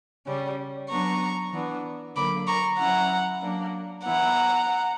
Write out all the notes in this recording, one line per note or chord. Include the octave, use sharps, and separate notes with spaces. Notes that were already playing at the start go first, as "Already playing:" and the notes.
C#3 G3 C#4
F#3 B3 D4 A#5 C#6
E3 B3 D4
D3 F#3 A#3 B5 D6
A#5 C#6
F#3 C#4 E4 F#5 A#5
F#3 A#3 D4
E3 B3 E4 F#5 A#5